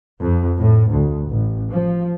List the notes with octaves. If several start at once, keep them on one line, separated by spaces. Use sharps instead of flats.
F2
A2
D2
A1
F3